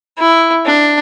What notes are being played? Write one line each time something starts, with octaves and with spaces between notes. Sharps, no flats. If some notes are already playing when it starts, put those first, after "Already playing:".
E4
D4